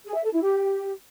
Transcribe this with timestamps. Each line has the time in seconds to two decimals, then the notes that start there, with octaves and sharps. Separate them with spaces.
0.06 G#4
0.15 E5
0.24 A4
0.32 E4
0.41 G4